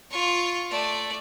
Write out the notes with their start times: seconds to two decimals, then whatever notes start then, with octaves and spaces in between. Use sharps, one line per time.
0.10 F4 C#6
0.70 A3 D5